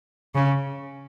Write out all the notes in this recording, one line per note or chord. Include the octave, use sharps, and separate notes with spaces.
C#3